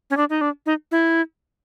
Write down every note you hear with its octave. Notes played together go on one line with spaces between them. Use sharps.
C#4
D4
D#4
D4
D#4
E4